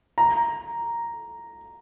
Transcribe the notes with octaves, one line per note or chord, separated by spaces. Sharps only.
A#5